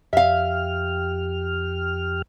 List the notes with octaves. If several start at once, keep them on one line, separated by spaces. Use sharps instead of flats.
F2 G4 E5 F5 F6